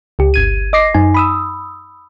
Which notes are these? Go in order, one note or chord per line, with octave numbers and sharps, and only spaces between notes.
C#2 G4
G1 G#6 D#7
D#5 D6 A#6 C7
F#2 D#4 G#5
B5 D#6 E6